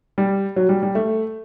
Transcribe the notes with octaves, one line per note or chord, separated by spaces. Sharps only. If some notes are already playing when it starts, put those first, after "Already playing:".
G3
F#3
G3
G3
A3